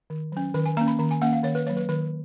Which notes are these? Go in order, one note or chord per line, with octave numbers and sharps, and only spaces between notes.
D#3
F#3 C#4
D#3 B4
G#5
A#3 C#4 A#5
B5
D#3 A#5
G#5
A#3 C#4 F#5
F5
D#3 C#5
B4
F#3 A#3 C#5
B4
D#3 B4